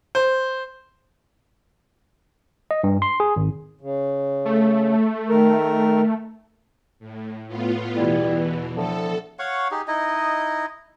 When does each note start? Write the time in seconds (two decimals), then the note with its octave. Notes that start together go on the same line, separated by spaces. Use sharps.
0.15 C5
2.71 D#5
2.84 G2
3.02 C6
3.20 G#4
3.36 G#1
3.81 C#3
4.45 A3
5.29 D#3 A#4
6.99 A2
7.48 A2 B3 F4
7.96 E2 B2 E3 G3 E4
8.76 A2 D3 F3 A4
9.39 C#5 F5 F#5 C#6
9.71 D#4 G4 G#4
9.88 D#4 E4 D#5